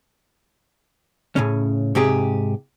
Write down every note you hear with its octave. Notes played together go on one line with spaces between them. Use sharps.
A2 C#3 C#4
G#2 C3 G4 G#4